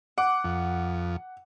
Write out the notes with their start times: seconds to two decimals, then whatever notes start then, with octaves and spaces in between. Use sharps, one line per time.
0.18 F#5 D6
0.44 F2